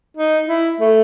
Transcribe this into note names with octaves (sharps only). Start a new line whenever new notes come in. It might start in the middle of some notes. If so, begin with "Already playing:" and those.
D#4
E4
A3